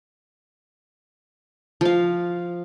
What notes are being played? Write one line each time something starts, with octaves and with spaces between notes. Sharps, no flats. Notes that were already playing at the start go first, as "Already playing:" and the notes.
F3 F5